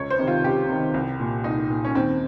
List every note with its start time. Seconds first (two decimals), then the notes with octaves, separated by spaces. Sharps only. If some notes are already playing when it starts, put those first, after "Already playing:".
Already playing: C#2 C#5
0.10 C5
0.19 C3 D#3
0.27 F4
0.44 C#2 G4
0.69 C3 D#3
0.94 C2
1.20 A#2
1.44 C2 D#4
1.69 A#2
1.85 C#4
1.95 D#2 C4